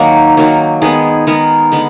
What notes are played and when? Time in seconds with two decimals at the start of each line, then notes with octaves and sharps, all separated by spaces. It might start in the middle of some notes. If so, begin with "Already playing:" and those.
Already playing: D#3 F#3 A#3 D#4 F#4
0.37 D#3 F#3 A#3
0.82 D#3 G#3 B3 G#4
1.27 D#3 G#3 B3 A#4
1.72 D3 G#3 B3